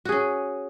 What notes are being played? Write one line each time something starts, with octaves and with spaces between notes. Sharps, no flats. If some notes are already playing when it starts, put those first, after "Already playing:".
C#4 F#4 G#4